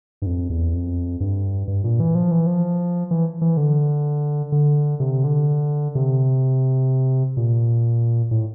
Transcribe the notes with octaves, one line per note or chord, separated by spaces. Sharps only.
G2
F2
E2
F2
G2
G2
A#2
E3
F3
E3
F3
E3
E3
D3
D3
C3
D3
C3
A#2
A2